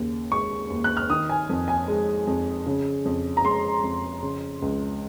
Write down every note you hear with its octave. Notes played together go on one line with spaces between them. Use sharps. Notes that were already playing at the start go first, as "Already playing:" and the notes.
Already playing: D#2 C#3
G#3 C#6
D#2
F#6
F6
D#3 D#6
G#5
F2
G#5
G#3
F2
C#3
F2
A#5
G#3 C6
F2
C#3
C#2